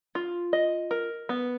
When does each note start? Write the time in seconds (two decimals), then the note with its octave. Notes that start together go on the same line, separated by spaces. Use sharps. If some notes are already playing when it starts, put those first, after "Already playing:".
0.15 F4
0.53 D#5
0.91 A#4
1.29 B3